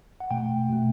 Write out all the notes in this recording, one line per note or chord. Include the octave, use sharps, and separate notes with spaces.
F#5
B2 A3 G5
B2 A3